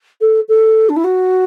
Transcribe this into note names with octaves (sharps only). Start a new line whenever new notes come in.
A4
A4
D4
E4
F#4